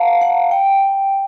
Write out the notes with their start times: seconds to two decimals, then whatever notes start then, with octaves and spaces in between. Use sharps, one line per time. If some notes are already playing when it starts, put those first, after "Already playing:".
Already playing: F5 F#5 A5 A#5
0.21 F#5
0.51 G5